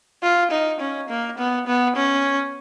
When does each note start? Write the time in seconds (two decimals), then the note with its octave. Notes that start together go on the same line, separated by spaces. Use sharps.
0.23 F4
0.51 D#4
0.80 C#4
1.09 A#3
1.38 B3
1.67 B3
1.96 C#4